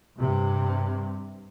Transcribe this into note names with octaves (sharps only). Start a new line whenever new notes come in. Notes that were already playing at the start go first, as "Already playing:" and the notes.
G2 C3